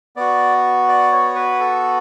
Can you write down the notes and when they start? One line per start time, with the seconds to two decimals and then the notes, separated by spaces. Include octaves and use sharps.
0.16 B3 F#4 D5
0.88 D5
1.12 C#5
1.35 B4
1.60 A4